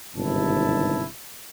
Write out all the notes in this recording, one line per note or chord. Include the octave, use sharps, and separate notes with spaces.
G1 G#2 C3 D#3 E4 A5